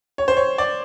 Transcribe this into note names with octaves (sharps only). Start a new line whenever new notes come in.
C#5
C5
C#5
D5